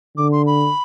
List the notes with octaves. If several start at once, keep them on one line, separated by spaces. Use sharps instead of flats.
D3 D6
C6
B5